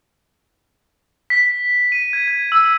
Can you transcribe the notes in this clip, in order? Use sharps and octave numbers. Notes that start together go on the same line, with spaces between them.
B6
D#7
G#6
G#6
E6